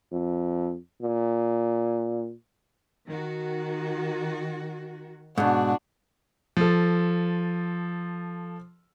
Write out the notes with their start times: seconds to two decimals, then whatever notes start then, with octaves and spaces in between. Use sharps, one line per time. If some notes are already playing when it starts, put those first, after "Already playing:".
0.12 F2
1.02 A#2
3.08 D#3 F#4
5.38 G#2 B2 D4 F#4
6.57 F3 A4